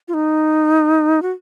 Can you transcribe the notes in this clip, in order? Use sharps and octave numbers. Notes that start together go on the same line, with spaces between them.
F4
D#4
F#4